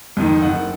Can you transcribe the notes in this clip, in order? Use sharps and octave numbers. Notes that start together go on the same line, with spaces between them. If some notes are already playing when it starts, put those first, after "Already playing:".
F2 D#3
F#1 F#5